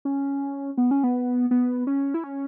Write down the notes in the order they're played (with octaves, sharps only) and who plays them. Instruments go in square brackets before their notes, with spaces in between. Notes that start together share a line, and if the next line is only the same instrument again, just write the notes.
[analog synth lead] C#4
B3
C#4
B3
B3
C#4
E4
C#4